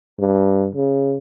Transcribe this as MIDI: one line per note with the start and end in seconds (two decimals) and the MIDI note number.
0.19 0.68 43
0.75 1.18 49